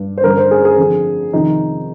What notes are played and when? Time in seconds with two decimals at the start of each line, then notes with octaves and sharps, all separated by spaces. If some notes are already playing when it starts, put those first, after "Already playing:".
Already playing: G2
0.18 C5
0.24 G2 D3 A#4
0.37 C5
0.51 G#4
0.65 G#4
0.78 F2 D3
1.33 F2 C3 D#3 D#4